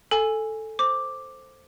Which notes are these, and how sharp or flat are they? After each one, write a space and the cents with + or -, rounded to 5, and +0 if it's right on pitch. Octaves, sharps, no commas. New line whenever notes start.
A4 +0 G#5 +0
C5 +0 D6 +0